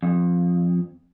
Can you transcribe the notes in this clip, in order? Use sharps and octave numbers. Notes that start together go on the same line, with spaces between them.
F2